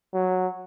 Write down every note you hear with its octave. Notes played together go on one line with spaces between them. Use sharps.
F#3